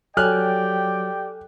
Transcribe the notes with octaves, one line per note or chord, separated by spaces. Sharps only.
F#3 G4 A4 D5 G5 G#5 F6 F#6